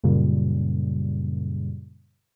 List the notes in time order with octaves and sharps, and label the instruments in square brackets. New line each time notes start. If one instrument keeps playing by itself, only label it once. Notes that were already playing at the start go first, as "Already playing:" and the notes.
[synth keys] F#2 A#2 C#3 G3